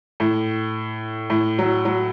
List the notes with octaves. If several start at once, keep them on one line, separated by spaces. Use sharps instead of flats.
A2
A2
F#3
F#3